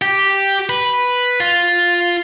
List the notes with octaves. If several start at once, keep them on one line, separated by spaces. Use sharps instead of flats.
G4
B4
F4